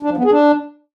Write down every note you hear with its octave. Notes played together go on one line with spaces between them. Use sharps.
D4
F3
B3
G#4
D4